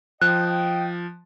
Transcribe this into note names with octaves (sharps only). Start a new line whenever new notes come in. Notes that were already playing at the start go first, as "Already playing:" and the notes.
F3 D#5 G5 F#6